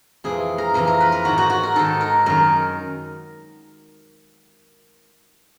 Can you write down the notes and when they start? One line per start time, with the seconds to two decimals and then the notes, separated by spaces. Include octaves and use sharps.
0.24 F2 C3 E3 G#4
0.58 A#4
0.74 F2 C3 E3 A#4
0.87 A#4
1.00 B4
1.12 A#4
1.25 G#2 D#3 F#4
1.38 F#4
1.50 F#4
1.63 A#4
1.75 G#2 D#3 A4
2.01 A#4
2.26 F#2 D#3 A#4